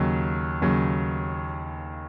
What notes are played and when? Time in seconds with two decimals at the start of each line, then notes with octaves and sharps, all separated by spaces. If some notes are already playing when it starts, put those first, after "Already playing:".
Already playing: D#2 C#3 F#3
0.62 D#2 C#3 F#3